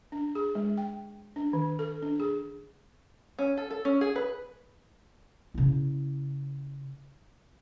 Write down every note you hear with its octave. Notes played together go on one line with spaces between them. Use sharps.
D4
G#4
G#3
G5
D4
D#3
A4
D4
G#4
C#4
A4
A4
C#4
G#4
B4
C#3 E4